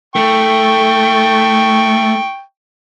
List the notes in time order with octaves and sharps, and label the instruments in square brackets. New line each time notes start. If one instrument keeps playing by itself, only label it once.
[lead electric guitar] A3 [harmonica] G5 C#6